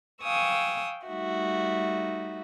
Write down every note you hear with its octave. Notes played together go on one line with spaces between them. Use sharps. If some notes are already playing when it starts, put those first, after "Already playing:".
F5 G5 G#5 C#6 D#6 E6
G3 A3 D#4 F#4 E5